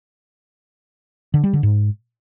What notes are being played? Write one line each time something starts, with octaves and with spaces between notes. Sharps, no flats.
D3
G3
D3
G#2